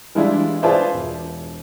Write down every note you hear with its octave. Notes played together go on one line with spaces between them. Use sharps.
E3 G3 G#3 D4 E4 F4
F4 G#4 B4 C5 D5 E5
E1